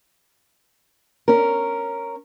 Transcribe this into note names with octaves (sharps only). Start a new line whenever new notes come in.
C#4 A#4